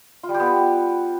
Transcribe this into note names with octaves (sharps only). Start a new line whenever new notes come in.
F4
G3
G4
B3